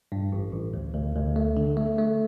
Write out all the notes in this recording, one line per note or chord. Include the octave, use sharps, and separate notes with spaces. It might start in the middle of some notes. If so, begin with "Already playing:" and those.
G2
A1
A1
D2
D2
D2
A3
D3
A3
A3